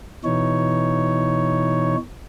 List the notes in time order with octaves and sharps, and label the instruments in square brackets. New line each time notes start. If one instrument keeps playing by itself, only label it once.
[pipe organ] B2 E3 D#4 C#5